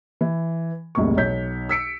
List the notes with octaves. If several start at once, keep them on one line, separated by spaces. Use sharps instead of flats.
E3
E1 B1 A2 C3 A#3 C#6
B1 C#5 G6 B6
E6 B6 C#7 D7